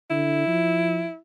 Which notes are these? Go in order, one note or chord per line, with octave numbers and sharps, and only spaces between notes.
D3 E4
F3